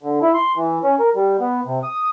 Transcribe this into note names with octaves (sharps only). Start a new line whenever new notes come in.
D3
E4
C6
E3
C#4
A#4
G3
B3
C3
D#6